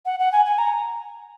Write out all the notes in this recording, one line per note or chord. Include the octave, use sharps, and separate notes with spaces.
F#5
F#5
G#5
G#5
A#5